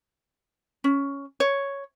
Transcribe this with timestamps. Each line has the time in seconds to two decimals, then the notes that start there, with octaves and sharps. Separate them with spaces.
0.84 C#4
1.40 C#5